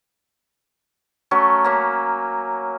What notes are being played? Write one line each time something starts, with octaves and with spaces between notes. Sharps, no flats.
F#3 A3 C#4
A#3 C#4